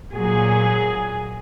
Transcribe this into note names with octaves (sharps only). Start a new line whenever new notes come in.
A#2 F#3 G#4